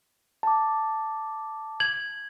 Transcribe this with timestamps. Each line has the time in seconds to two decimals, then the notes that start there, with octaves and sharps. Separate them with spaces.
0.43 A5 D6
1.80 G#6 F#7